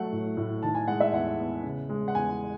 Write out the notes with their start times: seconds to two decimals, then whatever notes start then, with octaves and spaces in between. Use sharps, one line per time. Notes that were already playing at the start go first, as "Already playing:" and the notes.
Already playing: F#3 A3 F#5
0.12 A2
0.37 A2
0.63 D#3 A5
0.75 G#5
0.88 G#3 F#5
1.00 E5
1.13 E2 F#5
1.39 B3
1.64 C#3
1.89 G#3
2.08 F#5
2.15 E2 G#5